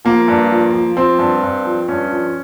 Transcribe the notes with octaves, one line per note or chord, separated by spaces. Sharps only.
F3 A#3
G2
F3
F3
F3 C4
G2
G2
F3
G2 C#4
F3